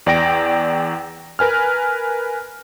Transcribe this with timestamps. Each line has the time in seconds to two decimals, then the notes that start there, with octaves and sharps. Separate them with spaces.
0.06 E2 D5 G5 A#6 D7
1.39 A#4 B4 G#5 F6